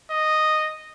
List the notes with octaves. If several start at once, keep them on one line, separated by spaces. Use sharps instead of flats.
D#5